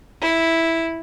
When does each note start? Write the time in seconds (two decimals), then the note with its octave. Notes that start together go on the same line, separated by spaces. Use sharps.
0.21 E4